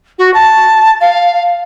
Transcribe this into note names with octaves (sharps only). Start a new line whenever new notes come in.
F#4
A5
F5